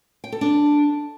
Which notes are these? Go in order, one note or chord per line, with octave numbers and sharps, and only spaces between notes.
G5
A4
D4